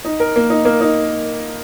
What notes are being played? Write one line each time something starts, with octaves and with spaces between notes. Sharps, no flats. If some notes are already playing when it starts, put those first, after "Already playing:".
D#4
A#4
A#3
D#4
A#3
D#4